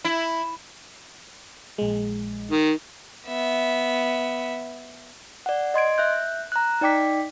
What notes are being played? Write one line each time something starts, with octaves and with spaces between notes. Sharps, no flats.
E4
A#1 G#3
D#3
B3 E5
D5 F#5
D#5 C6 G#6 D7
E5 F#6 G6
A#5 F#6
D#4 D5 G5 D6 B6